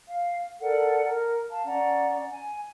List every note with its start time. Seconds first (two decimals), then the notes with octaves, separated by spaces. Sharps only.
0.08 F5
0.60 A4 A#4 D5 F#5
1.03 A#4
1.50 F5 A5
1.66 C#4 D5 F#5 A#5
2.32 G#5